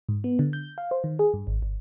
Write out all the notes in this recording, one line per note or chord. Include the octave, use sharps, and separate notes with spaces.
G#2
B3
D3
G6
F5
C5
D#3
G#4
G2
G#1
G1